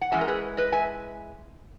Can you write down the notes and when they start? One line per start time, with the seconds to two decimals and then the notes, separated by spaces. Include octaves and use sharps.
0.01 F#5
0.12 E3 G#3 C#4 E5 G#5
0.21 A#4
0.28 G#4 B4
0.57 B4 D#5
0.72 E5 G#5